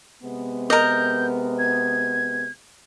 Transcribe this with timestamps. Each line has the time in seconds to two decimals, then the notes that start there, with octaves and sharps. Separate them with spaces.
0.23 C3 G#3 B3
0.70 A#4 D#5 G6
1.59 G#6